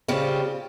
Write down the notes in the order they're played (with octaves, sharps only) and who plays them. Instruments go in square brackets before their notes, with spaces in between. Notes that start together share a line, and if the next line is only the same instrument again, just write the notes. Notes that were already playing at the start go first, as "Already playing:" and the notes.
[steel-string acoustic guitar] C#3 G3 C4 F4